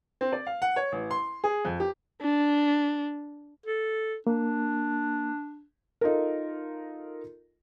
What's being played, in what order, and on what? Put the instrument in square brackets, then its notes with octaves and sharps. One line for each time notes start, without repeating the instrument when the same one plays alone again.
[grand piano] C4
D5
F5
F#5
C#5
A1
C6
G#4
F2
G4
[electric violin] D4
[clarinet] A4
[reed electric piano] A#3 [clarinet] D4
[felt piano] D#4 F4 A4 A#4